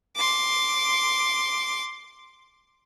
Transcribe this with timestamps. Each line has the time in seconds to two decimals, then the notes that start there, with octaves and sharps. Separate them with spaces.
0.16 C6 D6